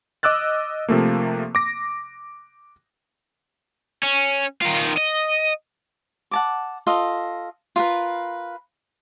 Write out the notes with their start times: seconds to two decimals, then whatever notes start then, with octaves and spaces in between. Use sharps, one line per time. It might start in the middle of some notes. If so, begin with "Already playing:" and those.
0.23 D#5 D6 E6 F#6 A6
0.88 C3 F3 A3 A#3
1.55 D6 A#6
4.03 C#4
4.62 D#3 F4
4.97 D#5
6.31 F#5 A5 D6
6.87 F4 A4 D#5
7.76 F4 A#4 B4